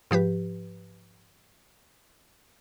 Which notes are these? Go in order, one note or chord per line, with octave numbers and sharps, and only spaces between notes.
G#2 F3 G4 B4